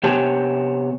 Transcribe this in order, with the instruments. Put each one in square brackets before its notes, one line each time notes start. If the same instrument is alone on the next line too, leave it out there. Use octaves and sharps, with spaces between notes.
[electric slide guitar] C3 B3 G4 C#5 G#5 A5